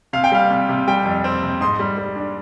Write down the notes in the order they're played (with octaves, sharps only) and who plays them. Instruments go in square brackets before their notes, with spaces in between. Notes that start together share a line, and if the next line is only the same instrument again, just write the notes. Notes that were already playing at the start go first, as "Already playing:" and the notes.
[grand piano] C3 F5
G5
G3 F5
C3
C3
G3 G5
F2
C4
C3
G#2 C6 D#6
G3
G3
D4